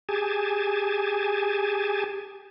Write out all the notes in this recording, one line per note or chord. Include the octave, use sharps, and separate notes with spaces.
G4 G#4 G#5 A5